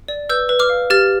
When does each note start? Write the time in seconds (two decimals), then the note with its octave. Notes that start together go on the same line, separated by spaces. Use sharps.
0.08 D5
0.29 B4 E6 G6
0.49 B4
0.59 D6 F6
0.69 F5
0.90 G4 F6 A6